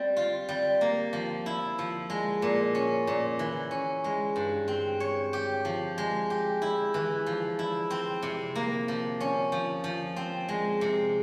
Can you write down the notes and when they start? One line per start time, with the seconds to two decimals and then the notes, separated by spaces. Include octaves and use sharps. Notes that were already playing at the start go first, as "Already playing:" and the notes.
Already playing: G3 C4
0.17 F4
0.49 G3
0.81 A#3
1.13 F3
1.46 E4
1.79 F3
2.10 G#3
2.42 A#2
2.75 C#4
3.07 A#2
3.39 E3
3.71 C#4
4.04 G#3
4.36 G2
4.68 C4
5.00 C#5
5.33 G4
5.65 F3
5.98 G#3
6.30 G4
6.62 E4
6.94 E3
7.27 F3
7.59 E4
7.90 C4
8.23 C3
8.56 A#3
8.88 F3
9.20 C#4
9.52 F3
9.84 F3
10.16 C4
10.49 G#3
10.81 C3